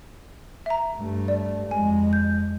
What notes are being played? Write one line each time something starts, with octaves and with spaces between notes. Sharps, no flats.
E5 A#5
G2 A3
D5
F2 G#3 G#5
G6